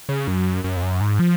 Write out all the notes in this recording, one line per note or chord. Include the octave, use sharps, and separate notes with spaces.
C#3
F#2
F#2
F2
F#2
G#2
F3